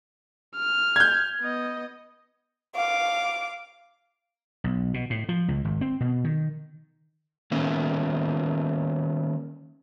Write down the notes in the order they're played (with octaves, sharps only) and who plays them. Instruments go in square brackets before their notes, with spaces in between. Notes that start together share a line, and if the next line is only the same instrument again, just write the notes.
[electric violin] F6
[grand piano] G6 G#6
[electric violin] B3 D#5
[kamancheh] F5 D6
[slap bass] B1
B2
A2
F3
C#2
G#1
C4
B2
D#3
[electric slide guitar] D#3 A#3 B3 C#4